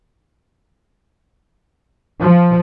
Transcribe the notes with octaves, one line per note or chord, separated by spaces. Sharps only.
F3